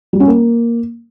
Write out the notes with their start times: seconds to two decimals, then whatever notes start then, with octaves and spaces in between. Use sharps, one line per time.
0.13 G3
0.20 C#4
0.27 A#3